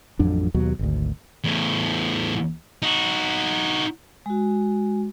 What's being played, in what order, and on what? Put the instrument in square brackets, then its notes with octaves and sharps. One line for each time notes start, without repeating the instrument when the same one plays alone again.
[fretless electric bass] A1 F2 F#3 D4
D#2 B2 F#3
G#1 D2
[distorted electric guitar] E2 A2
D#4 F#4
[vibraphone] G#3 F#4